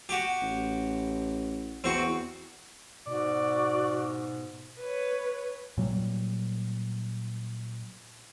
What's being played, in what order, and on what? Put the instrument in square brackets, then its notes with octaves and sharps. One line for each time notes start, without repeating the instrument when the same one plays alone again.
[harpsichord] F#4 G4
[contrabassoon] A1
[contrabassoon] E2 [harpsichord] C4 F#4
[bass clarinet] G#2 [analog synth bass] B2 [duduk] F#4 [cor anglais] D5
[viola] B4 C#5
[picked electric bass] A#2 F#3 G3